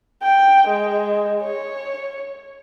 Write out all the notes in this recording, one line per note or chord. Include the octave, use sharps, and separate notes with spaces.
G5
G#3
C#5